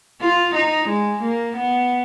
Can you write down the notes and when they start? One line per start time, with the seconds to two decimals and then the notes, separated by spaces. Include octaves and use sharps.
0.21 F4
0.55 D#4
0.88 G#3
1.22 A#3
1.56 B3